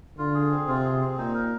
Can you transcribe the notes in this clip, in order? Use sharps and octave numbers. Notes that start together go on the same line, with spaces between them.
D3 F4
G#4
C4
C3 F4
G#4
C4
A#2 D#4
A#4